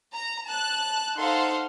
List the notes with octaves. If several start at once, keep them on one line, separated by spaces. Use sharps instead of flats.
A#5
A5 F#6
D#4 A4 C5 F5 F#5 C6